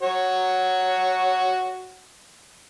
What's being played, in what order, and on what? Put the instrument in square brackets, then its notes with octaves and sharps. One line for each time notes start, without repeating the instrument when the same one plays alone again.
[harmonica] F#4 C#5